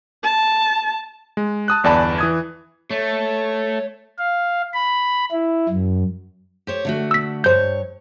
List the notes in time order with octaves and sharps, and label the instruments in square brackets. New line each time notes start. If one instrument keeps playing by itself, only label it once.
[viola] A5
[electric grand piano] G#3
A5 D#6 F#6
G1 E2 D5 A5 B5
E3 D#6 G#6
[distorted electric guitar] A3 [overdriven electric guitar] C#5
[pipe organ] F5
B5
E4
F#2
[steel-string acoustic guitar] G4 C5 C#5
D3 A3 F#4
[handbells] E6 B6
[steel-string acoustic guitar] G2 G#4 C#5 [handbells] C5 G6